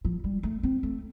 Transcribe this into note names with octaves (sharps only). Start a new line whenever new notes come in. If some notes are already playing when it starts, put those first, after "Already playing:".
F3
G3
A3
C4
A3